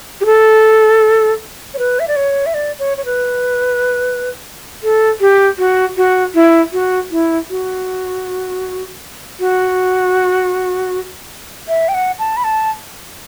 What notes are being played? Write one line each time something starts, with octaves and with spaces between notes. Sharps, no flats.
G4
A4
C#5
B4
E5
D5
C#5
E5
D5
C#5
C#5
B4
A4
G4
F#4
F#4
E4
F#4
E4
F#4
F#4
E5
G5
F#5
A5
B5
A5